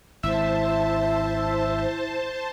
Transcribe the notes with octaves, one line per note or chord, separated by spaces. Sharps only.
G#1 E4 C5 E5 A5